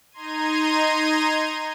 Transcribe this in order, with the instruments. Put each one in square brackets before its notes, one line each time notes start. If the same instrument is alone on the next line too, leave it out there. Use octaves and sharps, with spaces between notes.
[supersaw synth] D#4 A#5 C6 G#6 D#7